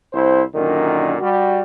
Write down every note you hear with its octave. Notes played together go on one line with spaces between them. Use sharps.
C2 E4 C5
F#2 A#2 D3 D#3
G3 F#4